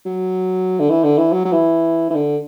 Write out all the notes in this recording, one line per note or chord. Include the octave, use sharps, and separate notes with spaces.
F#3
D3
E3
D3
E3
F#3
F#3
E3
E3
D3